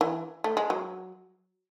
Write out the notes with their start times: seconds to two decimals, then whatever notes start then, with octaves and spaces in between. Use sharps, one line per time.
0.01 E3
0.44 A3
0.57 G#3
0.70 F#3